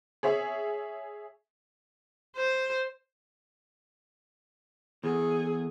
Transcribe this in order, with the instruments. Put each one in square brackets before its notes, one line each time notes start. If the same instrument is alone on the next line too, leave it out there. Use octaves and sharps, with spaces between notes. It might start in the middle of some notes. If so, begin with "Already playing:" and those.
[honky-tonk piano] G#4 C#5 E5
[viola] C5
[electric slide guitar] E2 [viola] G#4 A4